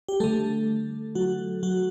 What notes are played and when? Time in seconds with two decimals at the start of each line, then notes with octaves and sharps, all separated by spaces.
0.09 G4
0.20 D3 G3 A3 A4
1.15 F#3 F#4
1.63 F#3 F#4